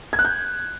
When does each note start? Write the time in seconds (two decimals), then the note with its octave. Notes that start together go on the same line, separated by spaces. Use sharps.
0.13 G#6
0.19 F#6
0.25 G6